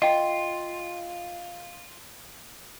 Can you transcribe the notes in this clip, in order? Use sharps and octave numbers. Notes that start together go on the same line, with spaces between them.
F4 D#5 G5